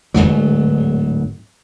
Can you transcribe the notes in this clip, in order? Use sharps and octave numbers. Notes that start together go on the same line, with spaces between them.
D1 G1 G#2 F#3